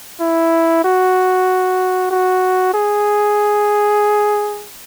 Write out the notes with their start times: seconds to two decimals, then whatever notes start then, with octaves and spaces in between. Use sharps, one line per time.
0.20 E4
0.84 F#4
2.11 F#4
2.74 G#4